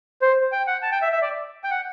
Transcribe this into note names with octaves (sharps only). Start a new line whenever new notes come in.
C5
G5
F#5
A5
G5
E5
E5
D5
G5
F#5